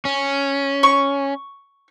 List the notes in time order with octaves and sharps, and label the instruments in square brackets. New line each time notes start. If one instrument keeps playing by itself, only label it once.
[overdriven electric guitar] C#4
[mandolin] C#6